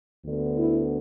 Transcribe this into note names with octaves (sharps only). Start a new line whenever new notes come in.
D2 D3 B3
E4